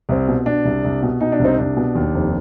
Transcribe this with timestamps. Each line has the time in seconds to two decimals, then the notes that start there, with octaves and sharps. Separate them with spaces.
0.09 C2 C4
0.28 B2
0.46 B2 D4
0.65 C2
0.84 C2
1.03 B2
1.20 B2 D#4
1.32 D4
1.39 C2 C4 D#4
1.58 C2 D4
1.76 B2
1.95 D#2
2.14 F1